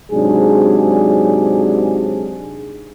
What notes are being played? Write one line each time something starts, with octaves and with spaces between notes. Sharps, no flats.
G#2 C3 F#3 D4 G#4